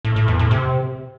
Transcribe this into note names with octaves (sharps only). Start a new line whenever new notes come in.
A2
A2
E2
A2
C3